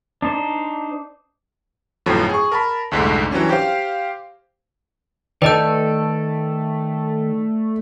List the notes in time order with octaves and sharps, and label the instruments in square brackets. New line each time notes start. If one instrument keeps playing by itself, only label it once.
[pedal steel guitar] D4 D#4 C5
[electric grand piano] G1 F2 A2 F3 F#3
G#4 C#6
A#4 A5 B5
C2 F2 G#2 D3 A3
E3 F#3 G3 C#4 D4
G4 C5 F5
[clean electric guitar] D#3 A4 [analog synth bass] A3 [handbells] B4 D#5 G6 [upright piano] D5